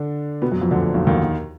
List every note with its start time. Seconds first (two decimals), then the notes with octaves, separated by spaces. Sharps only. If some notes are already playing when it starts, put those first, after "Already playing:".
Already playing: D3 D4
0.42 B2 B3
0.52 F#2 F#3
0.62 F2 F3
0.71 D2 D3
0.81 A#2
0.94 B1 B2
1.07 D#2 D#3